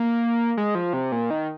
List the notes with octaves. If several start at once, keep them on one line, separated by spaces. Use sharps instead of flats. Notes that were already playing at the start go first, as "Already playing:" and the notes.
Already playing: A#3
G#3
F3
C3
A#2
D#3